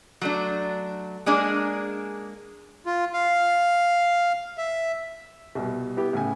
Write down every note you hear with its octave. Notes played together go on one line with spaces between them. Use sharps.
F#3 A3 D4
G#3 A#3 D4 G#4
F4
F5
E5
C2 B2 G3
B3 E4 G4
A2 C#3 G#5